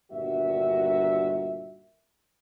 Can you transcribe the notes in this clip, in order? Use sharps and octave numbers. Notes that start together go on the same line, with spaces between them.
G1 G2 A#2 D#3 F#4 E5